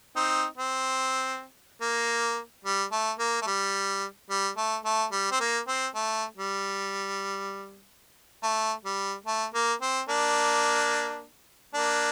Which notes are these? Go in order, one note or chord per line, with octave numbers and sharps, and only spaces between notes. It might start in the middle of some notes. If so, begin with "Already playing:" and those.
C4 D#4
C4
A#3
G3
A3
A#3
A3
G3
G3
A3
A3
G3
C4
A#3
C4
A3
G3
A3
G3
A3
A#3
C4
A#3 D4
A#3 D4